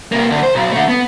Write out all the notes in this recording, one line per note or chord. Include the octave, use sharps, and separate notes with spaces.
C3 A#3
D2
C5
B1
D3 A3
B3